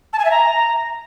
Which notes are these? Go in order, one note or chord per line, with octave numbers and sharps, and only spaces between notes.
A5
G#5
E5
A#5